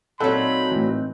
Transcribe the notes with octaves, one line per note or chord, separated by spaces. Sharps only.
A#2 F#3 C4 D#4 A4 F#5 B5
A2 E3